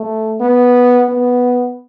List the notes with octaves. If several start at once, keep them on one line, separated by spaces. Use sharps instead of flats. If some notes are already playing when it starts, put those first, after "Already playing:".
Already playing: A3
B3
B3